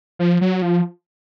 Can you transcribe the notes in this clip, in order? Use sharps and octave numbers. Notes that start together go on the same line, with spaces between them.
F3
F#3
F3